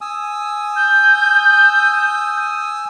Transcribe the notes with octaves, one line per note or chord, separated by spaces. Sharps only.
G#5 D#6 E6
G6